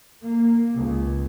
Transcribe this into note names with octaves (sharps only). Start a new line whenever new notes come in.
A#3
C#2